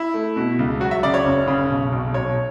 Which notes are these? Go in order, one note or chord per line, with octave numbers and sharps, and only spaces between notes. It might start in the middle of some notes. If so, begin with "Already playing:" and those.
Already playing: E4
A3
B2
C#2
F#3 F#4
E5
C#3 D5
C#5
F#1
C#3
B1
B1
B1 C#5